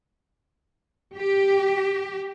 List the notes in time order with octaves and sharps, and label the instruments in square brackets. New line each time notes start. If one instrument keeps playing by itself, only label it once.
[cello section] G4